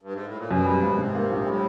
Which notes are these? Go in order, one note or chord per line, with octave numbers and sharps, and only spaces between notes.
G2
G#2
A2
A#2
F#2 B2
G3
G#1
G#2 C3
A#3
A#1
A2 G3